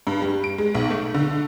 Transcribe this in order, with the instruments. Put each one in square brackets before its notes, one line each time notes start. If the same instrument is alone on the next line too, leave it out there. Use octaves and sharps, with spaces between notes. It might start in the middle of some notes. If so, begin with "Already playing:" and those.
[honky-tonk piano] G2
G3
D7
G#3
B1
A3
D3